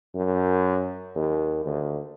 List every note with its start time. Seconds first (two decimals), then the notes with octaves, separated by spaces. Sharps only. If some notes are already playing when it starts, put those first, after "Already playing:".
0.15 F#2
1.16 D#2
1.66 D2